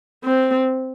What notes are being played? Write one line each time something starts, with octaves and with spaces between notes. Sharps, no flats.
C4